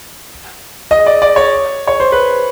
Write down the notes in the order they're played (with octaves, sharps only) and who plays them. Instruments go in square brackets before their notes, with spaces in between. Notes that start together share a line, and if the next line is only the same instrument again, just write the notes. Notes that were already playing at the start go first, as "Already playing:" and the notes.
[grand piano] D#5
D5
D5
C#5
C#5
C5
B4